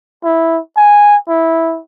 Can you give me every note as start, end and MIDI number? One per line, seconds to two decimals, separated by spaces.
0.24 0.59 64
0.77 1.16 80
1.28 1.80 64